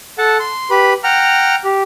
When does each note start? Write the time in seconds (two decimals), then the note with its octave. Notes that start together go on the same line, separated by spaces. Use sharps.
0.18 A4 F#5 A5
0.40 C6
0.70 G4 B4 B5
1.04 F#5 G5 A#5 F6
1.64 G4